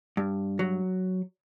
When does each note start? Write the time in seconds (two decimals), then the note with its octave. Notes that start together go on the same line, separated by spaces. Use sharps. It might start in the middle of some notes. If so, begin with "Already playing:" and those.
0.17 G2
0.59 F#3